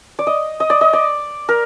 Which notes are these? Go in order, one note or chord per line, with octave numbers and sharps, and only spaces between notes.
D5
D#5
D#5
D5
D#5
D5
A#4